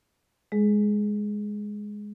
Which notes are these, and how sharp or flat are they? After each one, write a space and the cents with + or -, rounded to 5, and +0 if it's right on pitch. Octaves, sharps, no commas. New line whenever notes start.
G#3 +0 G#4 +20